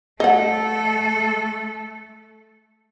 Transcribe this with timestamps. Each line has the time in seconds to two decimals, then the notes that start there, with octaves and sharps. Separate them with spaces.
0.20 A3 A4 D#5 F#5